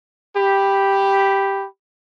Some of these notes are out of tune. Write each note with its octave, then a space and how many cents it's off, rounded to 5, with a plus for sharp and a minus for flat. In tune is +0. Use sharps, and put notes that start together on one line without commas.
G4 +0 B5 +0